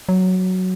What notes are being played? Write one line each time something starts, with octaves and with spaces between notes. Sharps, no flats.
F#3